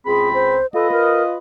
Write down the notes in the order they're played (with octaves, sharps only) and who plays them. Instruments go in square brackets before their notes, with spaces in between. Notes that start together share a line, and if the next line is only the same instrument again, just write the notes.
[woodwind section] C#2 C4 B5 [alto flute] G#4
[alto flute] C5
[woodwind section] F4 B4 D#5 [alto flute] A4
[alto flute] A#4